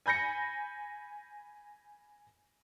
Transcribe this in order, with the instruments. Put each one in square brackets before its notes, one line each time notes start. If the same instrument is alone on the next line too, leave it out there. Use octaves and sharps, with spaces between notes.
[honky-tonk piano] G#5 B5 G6 A#6 C#7